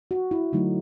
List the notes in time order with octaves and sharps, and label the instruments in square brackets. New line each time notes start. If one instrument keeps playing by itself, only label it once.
[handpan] F#4
E4
D3 F#3 A3 D#4